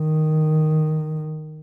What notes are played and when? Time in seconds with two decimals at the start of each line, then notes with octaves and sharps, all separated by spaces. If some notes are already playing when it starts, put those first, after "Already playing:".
Already playing: D#3